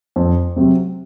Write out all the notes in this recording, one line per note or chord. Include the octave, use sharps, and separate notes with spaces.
F2
C3 F#3 C4